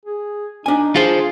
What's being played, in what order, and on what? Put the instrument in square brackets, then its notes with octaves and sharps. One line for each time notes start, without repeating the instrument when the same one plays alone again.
[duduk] G#4
[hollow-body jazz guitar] D4 G#5 [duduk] D#4
[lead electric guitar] F4 C5 [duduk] G#4